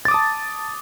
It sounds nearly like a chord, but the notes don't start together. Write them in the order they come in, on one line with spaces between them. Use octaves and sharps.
A6 D6 D#6 A5